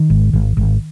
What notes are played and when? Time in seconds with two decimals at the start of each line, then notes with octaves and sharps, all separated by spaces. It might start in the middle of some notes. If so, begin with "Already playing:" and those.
Already playing: D#3
0.10 G#1
0.33 G#1
0.57 G#1